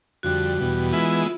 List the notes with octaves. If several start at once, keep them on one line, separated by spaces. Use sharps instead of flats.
F2 D3 G3 F#4
E2 B2 G3
E3 G#3 B3 E4 F4